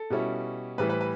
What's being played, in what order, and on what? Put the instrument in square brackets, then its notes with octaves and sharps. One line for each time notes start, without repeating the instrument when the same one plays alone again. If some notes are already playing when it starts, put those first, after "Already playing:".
Already playing: [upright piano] A4
B2 G3 C#4 E4
A2 E3 G3 B4
B4
B4